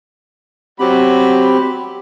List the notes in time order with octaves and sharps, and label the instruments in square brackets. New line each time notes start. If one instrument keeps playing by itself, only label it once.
[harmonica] F#3 F#4 B5 [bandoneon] C4 G4